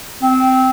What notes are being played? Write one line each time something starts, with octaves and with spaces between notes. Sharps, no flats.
C4